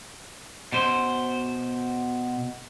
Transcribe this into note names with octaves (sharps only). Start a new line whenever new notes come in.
B2 C5